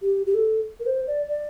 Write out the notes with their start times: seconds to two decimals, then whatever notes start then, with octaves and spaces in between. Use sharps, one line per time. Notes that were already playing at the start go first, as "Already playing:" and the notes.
0.02 G4
0.26 G4
0.34 A4
0.80 A#4
0.86 C5
1.07 D5
1.28 D5